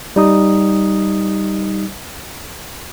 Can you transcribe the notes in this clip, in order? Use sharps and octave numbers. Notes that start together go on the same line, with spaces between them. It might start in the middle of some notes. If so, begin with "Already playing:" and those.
G3 D#4 D#6